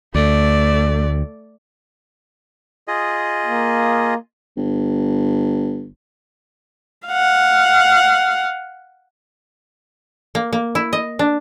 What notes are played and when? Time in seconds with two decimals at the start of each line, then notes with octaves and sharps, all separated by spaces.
0.15 D2 A3 D5
2.88 F4 G#4 D#5
3.46 A#3
4.57 G1
7.08 F5 F#5
10.35 A#3
10.53 A#3
10.75 E4
10.93 D#5
11.19 D4